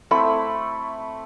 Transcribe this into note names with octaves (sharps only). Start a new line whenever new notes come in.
A3 C4 E4 B5